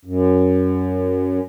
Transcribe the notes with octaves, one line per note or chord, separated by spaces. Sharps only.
F#2